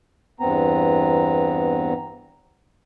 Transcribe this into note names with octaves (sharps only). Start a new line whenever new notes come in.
E2 G2 B3 C4 A#5